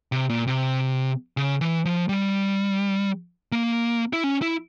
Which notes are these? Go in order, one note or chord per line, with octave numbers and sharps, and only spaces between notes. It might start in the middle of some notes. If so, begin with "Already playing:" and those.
C3
A#2
C3
C#3
E3
F3
G3
A#3
E4
C#4
E4